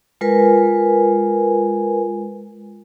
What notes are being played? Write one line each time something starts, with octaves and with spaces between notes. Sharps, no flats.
G#3 F4 A#4 B4 G#5